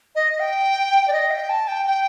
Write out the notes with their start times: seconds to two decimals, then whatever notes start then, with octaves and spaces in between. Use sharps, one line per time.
0.15 D#5
0.39 G5
1.08 D5
1.13 D#5
1.31 G5
1.49 A5
1.68 G5
1.86 G5